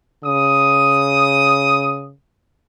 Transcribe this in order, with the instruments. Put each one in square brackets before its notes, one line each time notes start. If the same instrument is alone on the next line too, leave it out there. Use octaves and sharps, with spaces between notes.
[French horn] C#3 [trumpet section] D#6